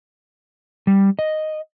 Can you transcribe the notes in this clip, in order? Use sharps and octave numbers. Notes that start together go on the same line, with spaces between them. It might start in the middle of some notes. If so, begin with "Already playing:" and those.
G3
D#5